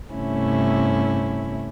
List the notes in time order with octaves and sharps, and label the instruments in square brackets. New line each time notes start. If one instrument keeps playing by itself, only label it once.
[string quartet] G2 C3 A3 C#4 E4